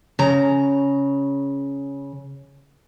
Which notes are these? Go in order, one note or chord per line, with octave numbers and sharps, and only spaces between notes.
C#3 A#5